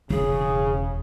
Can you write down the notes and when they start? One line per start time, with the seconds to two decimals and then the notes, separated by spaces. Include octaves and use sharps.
0.10 E1 C#3 G#4